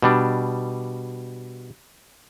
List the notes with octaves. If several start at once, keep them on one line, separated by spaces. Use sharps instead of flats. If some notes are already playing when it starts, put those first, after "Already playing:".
B2 G3 D4